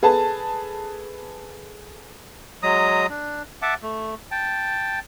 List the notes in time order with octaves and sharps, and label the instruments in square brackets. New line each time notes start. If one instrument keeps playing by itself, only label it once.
[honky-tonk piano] G#4 A4 B4 A5
[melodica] F#3 G#3 A#5 D#6
D4
E5 F#5 A5 D6
A3
G5 A5